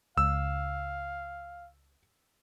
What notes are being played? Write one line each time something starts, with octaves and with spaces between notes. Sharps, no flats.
C#2 F5 E6